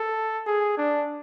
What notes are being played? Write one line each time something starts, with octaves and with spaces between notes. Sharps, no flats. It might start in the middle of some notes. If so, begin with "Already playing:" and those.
Already playing: A4
G#4
D4